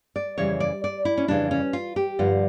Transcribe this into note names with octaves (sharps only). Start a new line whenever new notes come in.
D5
F2 C#3 E3 G3 C#5
D5
D5
E4
C#4
F2 C#3 E3 G3 D4
C#4
F4
G4
G2 D3 F3 F4